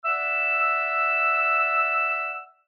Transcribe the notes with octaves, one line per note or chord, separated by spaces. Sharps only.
D5 E5 F#5 E6